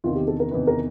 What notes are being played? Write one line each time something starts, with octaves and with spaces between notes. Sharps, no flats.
E2 C3 D#3 F4
G4
A4
A#4
E2 C3 D#3 B4
A#4